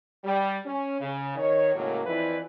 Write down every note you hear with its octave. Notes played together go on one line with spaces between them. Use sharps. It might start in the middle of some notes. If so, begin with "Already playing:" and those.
G3
C#4
C#3
D#3 C#5
A2 C#3 F#3 G#3 A#3
F2 E3 E4 F4 B4 D5